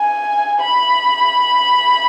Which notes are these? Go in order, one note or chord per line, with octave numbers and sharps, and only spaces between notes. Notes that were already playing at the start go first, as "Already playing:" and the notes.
Already playing: G#5
B5